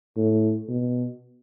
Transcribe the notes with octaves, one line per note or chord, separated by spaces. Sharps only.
A2
B2